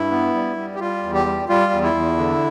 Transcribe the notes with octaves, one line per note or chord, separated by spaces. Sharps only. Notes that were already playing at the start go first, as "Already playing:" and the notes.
Already playing: G2 E4
B3
G3
G3
G4
G3 F4
E2
G4
G3
G3 F4
E2
E4
E2
D3